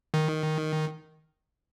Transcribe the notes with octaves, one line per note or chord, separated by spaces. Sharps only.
D#3